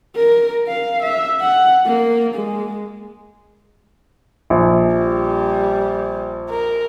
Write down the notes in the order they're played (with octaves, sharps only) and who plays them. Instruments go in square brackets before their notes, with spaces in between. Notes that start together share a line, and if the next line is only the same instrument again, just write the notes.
[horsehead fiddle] A#4
F5
E5
F#5
A#3
G#3
[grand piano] A#1
[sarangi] G3
A#4